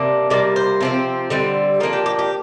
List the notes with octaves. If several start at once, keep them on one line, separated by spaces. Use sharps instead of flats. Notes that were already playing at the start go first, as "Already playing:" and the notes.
Already playing: C3 A#3 D4
C3 G3 A#3 D5
C5
C3 F3 C4
D3 G3 C4
F3 A#3 D4 A#4
G4
G4
G4